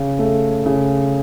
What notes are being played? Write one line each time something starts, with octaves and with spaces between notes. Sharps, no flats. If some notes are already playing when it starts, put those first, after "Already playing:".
Already playing: C#3
A3
C#3